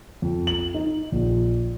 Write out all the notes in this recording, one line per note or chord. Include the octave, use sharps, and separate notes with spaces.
F2
F#7
D#4
A#1